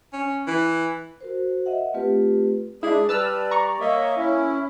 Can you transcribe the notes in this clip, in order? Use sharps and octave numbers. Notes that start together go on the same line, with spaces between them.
C#4
E3
F#4 A#4 C5
D#5 E5 F#5
A3 C4 F4 G4 B4
G#3 D4 E4 G#4
G3 B4 D5 A5 E6 F6
A#5 C#6
A#3 C#5 D#5 E5
C#4 E4